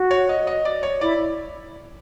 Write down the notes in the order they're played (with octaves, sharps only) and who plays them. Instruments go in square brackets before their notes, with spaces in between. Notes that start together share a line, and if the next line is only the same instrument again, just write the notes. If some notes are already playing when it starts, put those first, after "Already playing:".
Already playing: [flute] F#4
[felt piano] C#5
D#5
D#5
D5
C#5
[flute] E4 [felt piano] D5